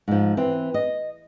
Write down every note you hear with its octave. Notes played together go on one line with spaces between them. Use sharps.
G#2 F3
E3 C4
D#5